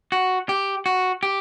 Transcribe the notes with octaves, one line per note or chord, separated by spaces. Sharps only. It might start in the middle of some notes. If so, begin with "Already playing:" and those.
F#4
G4
F#4
G4